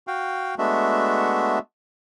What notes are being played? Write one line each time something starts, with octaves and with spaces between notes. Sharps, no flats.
F#4 F5 G5
G#3 A3 B3 D4 F#4 E5